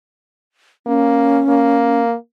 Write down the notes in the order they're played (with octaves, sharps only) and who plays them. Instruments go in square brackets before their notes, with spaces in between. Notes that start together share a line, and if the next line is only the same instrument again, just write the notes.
[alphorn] A#3 [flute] C#4
[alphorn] A#3